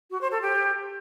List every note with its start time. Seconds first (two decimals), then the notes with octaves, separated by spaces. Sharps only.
0.11 F#4
0.21 C5
0.32 A4
0.42 G4